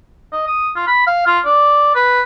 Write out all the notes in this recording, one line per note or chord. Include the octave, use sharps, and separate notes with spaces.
D#5
D#6
F4
B5
F5
F4
D5
B4